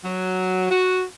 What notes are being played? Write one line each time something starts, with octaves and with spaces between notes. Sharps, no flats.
F#3
F#4